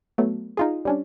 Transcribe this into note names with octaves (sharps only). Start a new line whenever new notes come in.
F#3 A3 B3
D#4 F4 G#4
G3 C#4 D4